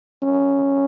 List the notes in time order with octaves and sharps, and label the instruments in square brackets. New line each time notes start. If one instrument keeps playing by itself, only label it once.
[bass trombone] C#4